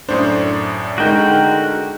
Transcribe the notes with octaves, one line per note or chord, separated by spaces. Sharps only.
F#2 A2 D4 C5
D3 G#3 D#4 F#4 G#4 A#4 G5 D7